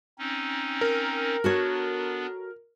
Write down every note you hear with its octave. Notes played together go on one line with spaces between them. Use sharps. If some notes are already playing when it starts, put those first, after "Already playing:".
C4 C#4 D#4
A#4
B3 D4 F#4 A4 C#5